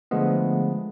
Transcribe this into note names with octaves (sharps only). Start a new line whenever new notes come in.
D3 F3 G#3 A3 B3